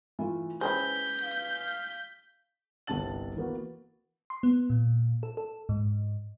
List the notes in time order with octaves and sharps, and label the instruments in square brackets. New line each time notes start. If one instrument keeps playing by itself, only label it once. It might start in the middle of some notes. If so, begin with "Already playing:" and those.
[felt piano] E3 A3 F4
[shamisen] G#3 C4 E4 [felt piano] C#4 B4 G#5 [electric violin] G6 B6
[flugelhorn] F5
[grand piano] G1 C2 C3 A5 A6 F#7
E3 A#3 B3 F#4
[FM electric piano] C6
B3
A#2
A4
A4
G#2